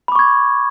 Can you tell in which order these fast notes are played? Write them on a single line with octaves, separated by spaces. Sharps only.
B5 D6 C#6 G#6